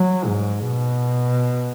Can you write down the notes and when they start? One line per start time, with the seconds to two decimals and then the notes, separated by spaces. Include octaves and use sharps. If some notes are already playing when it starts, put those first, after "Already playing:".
Already playing: F#3
0.26 G#2
0.59 B2